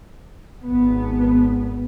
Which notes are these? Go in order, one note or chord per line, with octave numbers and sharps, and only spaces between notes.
G#1 B3